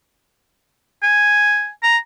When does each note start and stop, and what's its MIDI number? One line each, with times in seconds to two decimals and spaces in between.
1.03 1.69 80
1.83 1.97 82